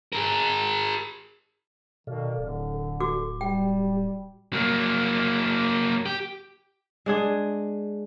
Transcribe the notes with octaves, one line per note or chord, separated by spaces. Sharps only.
G#4 A#4
B2 D#3 A4 D5 F5
D1 D3
A4
F#4 D6
G3 G4 G5
F#3 A#3
G4
G#3 D4 G#4